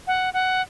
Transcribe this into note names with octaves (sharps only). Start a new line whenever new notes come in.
F#5
F#5